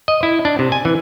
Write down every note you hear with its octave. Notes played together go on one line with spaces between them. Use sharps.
D#5
E4
D4
C3
G#5
E3